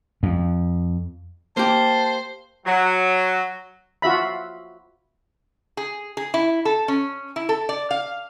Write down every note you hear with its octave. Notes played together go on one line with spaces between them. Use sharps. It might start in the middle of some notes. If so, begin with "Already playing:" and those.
F2
A#3 G4 C5 A5
F#3
F4 F#4 E5 B5
G#4
G#4
E4
A4
C#4
E4
A4
D5
F5